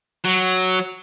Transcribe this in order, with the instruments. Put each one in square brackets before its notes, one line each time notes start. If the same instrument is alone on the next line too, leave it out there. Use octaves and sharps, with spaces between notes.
[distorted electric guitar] F#3